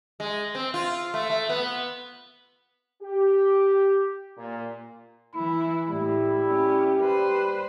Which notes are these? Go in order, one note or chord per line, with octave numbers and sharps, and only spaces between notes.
G#3
C4
F4
A3
A3
B3
G4
A#2
E3 E4 B5
A2 G3 E4
C#4 G4
B4 C5